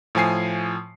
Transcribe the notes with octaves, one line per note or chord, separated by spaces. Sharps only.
A2 F3 G#5 C7